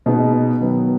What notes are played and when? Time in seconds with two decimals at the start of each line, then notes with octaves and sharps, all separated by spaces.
0.06 B2 B3 D#4 G#4
0.61 D#3 F#3 B3